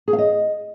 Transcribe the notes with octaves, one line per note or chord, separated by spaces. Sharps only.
G#4
F5
D#5